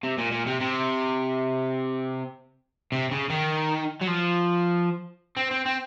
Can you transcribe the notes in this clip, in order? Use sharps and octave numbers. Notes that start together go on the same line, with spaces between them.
C3
A#2
A#2
C3
C3
C3
C#3
D#3
F#3
F3
C4
C4
C4